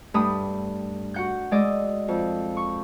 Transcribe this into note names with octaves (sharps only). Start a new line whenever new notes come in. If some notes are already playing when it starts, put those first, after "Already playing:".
G2 A3 D4 B5 D#6
F#4 F#5 G6
G#3 D5 D#5 E6
F2
C#6